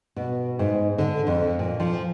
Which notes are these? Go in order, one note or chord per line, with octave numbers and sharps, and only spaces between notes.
B2
G#2
D3
F2
A#2
F3